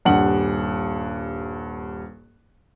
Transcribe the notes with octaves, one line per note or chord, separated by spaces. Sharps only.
D#1 G2 F#5 F#7